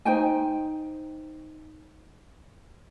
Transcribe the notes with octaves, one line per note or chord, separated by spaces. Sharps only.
D#4 C5 G5 G#5